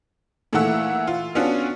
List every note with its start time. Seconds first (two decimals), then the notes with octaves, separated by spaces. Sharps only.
0.53 A#2 E3 A3 E4 F#5 E6
1.07 F4
1.35 B3 C#4 D4 F4 F#4